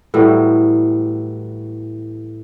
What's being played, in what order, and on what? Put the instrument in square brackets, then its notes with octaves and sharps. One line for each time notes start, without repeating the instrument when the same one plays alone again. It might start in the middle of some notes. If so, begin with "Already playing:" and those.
[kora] A2 E3 F#3 G3